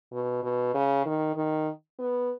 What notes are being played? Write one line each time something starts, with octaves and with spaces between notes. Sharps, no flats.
B2
B2
C#3
D#3
D#3
B3